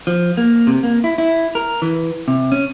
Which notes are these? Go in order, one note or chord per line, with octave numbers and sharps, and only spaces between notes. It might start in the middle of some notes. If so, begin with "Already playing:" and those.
F3
A#3
C3
A#3
E4
E4
A#4
E3
C3
C#4